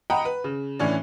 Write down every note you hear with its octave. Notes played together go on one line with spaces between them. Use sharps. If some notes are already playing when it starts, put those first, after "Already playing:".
D#5 F#5 G5 A#5 B5
B4
C#3
A2 E3 C#4 D4